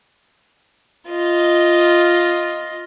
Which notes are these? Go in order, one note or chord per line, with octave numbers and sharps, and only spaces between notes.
F4 D#5